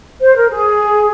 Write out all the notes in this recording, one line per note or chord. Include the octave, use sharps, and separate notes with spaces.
C5
A#4
G#4